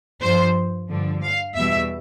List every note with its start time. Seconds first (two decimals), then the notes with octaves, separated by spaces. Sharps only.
0.21 G2 F3 C5
0.89 G2 D3 F3
1.22 F5
1.55 E2 B2 G3 E5